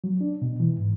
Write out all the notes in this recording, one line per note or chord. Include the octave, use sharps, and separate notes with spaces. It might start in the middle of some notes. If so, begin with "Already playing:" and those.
F#3
D4
B2
E3
G#2